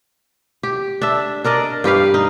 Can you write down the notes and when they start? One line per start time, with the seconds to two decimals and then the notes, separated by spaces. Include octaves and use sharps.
0.63 G4
1.02 D4 E5
1.44 D4 A#4 D5 D#5
1.84 G2 G4 B4 F5
2.14 D#4